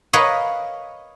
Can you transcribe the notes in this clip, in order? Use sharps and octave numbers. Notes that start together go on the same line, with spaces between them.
A#4 B4 C#5 D#5 F5 F#5